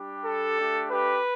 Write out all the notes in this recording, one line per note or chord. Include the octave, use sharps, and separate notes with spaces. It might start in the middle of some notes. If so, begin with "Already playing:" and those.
Already playing: G3 D4 G4
A4
A3 D4 G4
G4 B4